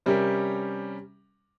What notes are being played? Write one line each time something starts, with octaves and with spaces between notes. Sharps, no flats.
C3 G3 C#4 G4 A#4